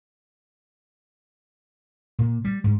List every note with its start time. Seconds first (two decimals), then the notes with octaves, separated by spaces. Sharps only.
2.19 A#2
2.45 G3
2.64 G#2